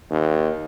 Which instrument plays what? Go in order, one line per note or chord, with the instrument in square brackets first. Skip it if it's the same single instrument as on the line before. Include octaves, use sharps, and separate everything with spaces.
[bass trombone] D#2